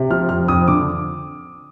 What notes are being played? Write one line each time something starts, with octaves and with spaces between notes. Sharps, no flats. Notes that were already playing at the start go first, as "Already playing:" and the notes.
Already playing: C3
F3 F6
F2 F6
F2 D#6
D3 D6